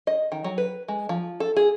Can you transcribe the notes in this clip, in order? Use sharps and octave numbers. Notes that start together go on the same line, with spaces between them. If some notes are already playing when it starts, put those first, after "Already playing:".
D#5
D#3
F#3
B4
G#3
F3
A4
G#4